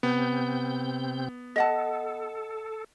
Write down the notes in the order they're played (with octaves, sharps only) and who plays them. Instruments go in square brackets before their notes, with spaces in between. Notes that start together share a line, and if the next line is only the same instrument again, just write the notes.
[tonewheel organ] C3 C4 G6 [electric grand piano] B3
[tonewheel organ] A4 [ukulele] D#5 F#5 A5